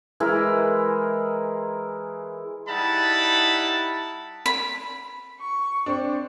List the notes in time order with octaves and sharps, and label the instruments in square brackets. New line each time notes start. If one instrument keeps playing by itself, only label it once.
[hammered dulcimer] E3 G#3 E4 A#4
[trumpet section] G3 D#4 E4 F#5 A5 B5
[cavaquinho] B5
[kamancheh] C#6
[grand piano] C4 D4